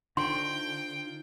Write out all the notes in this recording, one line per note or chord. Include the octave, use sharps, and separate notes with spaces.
D3 D#4 F4 C5 G5 C6